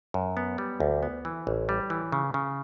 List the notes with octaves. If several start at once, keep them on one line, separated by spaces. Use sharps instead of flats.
F#2
B3
G3
D2
B3
E3
A1
G3
E3
C#3
C#3